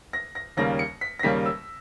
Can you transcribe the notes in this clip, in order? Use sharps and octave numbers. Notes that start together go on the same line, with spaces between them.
A#6
A#6
D#2 C#3 G3 A#3 A#6
C#7
B6
A#6
D#2 C#3 G3 A#3 B6
E6